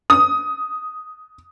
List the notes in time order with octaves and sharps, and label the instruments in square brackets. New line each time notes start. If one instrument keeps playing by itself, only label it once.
[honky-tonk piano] D#6